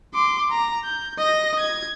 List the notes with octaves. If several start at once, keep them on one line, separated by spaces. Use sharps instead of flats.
C6 D6
A#5
G6
D#5 A#6
G#6